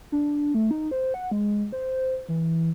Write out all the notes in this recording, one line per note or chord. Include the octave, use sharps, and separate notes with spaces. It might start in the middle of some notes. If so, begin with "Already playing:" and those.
D4
A3
D#4
C5
F#5
G#3
C5
E3